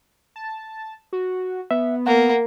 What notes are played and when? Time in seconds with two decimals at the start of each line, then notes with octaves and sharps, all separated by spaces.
0.36 A5
1.13 F#4
1.71 B3 E5
2.07 A#3 F#5